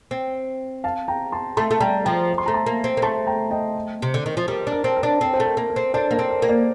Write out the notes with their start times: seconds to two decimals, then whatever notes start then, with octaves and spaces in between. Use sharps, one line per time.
0.11 C4
0.84 F5 A5
1.08 G5 A#5
1.32 A5 C6
1.57 A3 A5 C6
1.71 A3
1.80 G3 G5 A#5
2.05 F3 G5 A#5
2.38 C6
2.46 A3 A#5
2.54 A5 C6
2.66 A#3
2.84 C4
2.97 A#3
3.02 A3 A5 C6
3.27 G5 A#5
3.51 D#5 G5
4.02 C3
4.14 D3
4.26 D#3
4.37 F3
4.48 G3 A#4
4.67 D4
4.72 A#4
4.84 C4
4.97 A#4
5.03 D4
5.21 C4 A4
5.34 C5
5.40 A3
5.45 A#4
5.57 A#3
5.70 A#4
5.76 C4
5.94 D4 A4 C5
6.11 A#3 A#4 D5
6.19 C4
6.30 A#4
6.42 A#3
6.49 A#4 D5